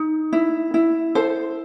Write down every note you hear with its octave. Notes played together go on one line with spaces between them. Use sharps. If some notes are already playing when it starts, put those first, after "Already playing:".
Already playing: D#4
E4
E4
A4 C5